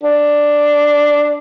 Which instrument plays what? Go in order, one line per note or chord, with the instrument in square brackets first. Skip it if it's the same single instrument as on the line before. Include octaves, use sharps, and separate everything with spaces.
[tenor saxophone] D4